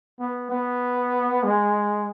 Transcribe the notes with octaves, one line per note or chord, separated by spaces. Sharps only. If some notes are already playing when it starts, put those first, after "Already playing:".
B3
B3
G#3